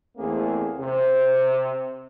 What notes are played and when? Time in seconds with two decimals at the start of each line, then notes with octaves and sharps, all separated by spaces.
0.18 E2 A3 A#3 C4 G#4
0.78 C3 C5